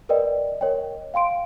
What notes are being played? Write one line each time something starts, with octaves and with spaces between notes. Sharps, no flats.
A#4 B4 D5 D#5 G5
A#4 C#5 D#5 G5
F5 G5 C6 D7